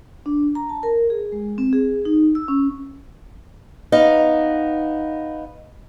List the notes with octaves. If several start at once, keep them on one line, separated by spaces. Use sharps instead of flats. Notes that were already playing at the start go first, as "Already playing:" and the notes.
D4
A#5
A5
A#4
G#4
G#3
C4
G#4
D#4
E6
C#4
B3 D#4 F5